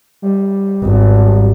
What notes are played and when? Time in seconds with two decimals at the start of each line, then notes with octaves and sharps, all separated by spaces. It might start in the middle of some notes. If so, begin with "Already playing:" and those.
0.22 G3
0.83 G#1